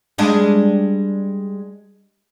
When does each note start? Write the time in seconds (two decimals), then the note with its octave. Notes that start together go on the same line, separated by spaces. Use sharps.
0.18 G3 G#3 D4